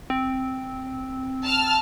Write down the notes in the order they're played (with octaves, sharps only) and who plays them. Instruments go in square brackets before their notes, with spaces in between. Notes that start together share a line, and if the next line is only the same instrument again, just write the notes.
[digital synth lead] C4
[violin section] A5 F6